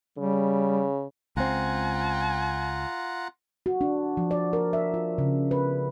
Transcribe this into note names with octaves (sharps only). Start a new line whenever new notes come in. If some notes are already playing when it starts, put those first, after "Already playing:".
C#3 G3
C#2 C4 F4 F#5 G#5 A#5
F#4
D4
F3
D5
A#4
E5
F4
C#3
B4